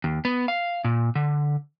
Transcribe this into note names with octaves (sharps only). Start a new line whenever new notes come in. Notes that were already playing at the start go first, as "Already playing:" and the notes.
D#2
B3
F5
A#2
D3